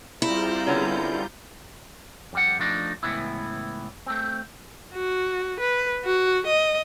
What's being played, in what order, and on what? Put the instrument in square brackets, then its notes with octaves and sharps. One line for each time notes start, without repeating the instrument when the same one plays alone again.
[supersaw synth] G3 F4 G6 [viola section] C4 G#4 A#5 [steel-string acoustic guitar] E4
[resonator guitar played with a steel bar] D3 B3 C#4
[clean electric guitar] F2 G3 F#5
F3 A3 D4 D#4
C#2 A2 C3 E3 B3 E4
A3 C4
[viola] F#4
B4
F#4
D#5